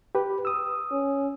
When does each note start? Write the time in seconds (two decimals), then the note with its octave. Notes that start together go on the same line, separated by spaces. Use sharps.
0.15 G4 B4
0.45 D#6 E6
0.92 C#4